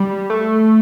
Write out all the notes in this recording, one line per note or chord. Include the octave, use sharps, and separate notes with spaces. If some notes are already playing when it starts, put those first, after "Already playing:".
Already playing: G3
A3